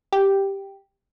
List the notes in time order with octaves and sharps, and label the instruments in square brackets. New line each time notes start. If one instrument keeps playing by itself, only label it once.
[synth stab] G4